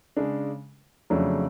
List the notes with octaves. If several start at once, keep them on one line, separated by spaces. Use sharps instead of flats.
C#3 G#3 D4
F2 C#3 F#3 A3 D4